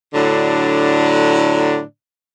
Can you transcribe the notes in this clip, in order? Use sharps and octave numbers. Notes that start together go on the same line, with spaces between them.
A2 D3 F#3 D4